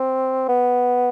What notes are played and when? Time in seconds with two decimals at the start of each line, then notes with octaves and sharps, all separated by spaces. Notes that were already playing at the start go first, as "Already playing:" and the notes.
Already playing: C4
0.48 B3